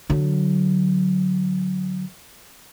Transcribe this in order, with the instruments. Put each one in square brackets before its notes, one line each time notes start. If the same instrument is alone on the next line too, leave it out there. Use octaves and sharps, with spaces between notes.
[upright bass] D3 F#3